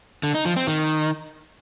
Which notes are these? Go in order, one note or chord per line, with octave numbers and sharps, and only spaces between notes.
D3
D#4
F3
C4
D#3